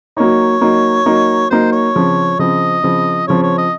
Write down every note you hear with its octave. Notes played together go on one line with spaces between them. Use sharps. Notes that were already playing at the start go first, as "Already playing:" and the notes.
F#3 A#3 D#4 C#5
F#3 A#3 D#4
F#3 A#3 D#4
F#3 A#3 D#4 C5
C#5
C#3 F3 C4
C#3 F3 C4 D#5
C#3 F3 C4
C#3 F3 C4 C#5
C#5
D#5